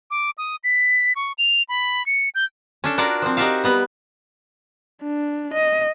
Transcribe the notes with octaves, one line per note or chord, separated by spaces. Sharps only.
D6
D#6
B6
C#6
F7
B5
C#7
G6
C#4 D4 A4
D4 F4 F#4 A#4 C#5 D5
F3 C4
D#4 F#4 G4 D5 E5 F5
G3 B3 B4
D4
D#5